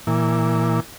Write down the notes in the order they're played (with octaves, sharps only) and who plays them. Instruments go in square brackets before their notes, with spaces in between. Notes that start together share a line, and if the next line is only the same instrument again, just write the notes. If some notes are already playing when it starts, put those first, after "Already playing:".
[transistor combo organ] A#2 E3